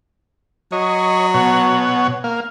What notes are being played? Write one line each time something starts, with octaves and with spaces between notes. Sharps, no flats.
F#3 C#5 D#5
B2 C#5 F#5
A#3 F5